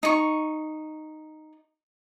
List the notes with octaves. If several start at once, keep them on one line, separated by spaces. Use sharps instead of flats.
D#4 C#6